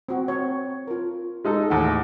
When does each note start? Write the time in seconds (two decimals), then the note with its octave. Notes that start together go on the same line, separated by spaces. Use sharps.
0.09 C4 F#4
0.28 C4 C#5
0.87 F4 A#4
1.45 G#3 D#4 A4
1.70 D#2 A2 F#5